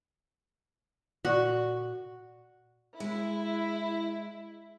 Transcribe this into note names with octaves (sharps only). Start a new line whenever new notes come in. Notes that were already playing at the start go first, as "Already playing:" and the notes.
A#2 F#4 D5 C#6
G#3 E4